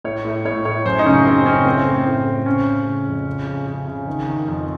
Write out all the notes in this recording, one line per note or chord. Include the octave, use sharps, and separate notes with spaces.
A2 C#5
A2
A2 C#5
A2 C#5
F#2 C5
D#4
C#3 C#4
C#3 C4
C#3 C#4
A2 C4
A2
A2
A2
C#3 C#4
C#3
C#3
F2
C#3
C#3
C#3
C#3
D#3
D#3
F2